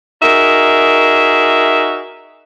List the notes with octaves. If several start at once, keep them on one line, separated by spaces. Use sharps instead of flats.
D#4 F#4 G#4 A#4 E5